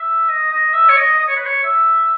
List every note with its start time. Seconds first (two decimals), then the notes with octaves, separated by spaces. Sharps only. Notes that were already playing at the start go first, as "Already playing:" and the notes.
Already playing: E5
0.29 D#5
0.51 D#5
0.74 E5
0.89 C#5
0.97 D#5
1.19 D#5
1.28 C#5
1.36 B4
1.46 C#5
1.63 E5